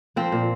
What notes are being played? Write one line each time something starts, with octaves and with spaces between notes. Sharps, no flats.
F3 C4
A#2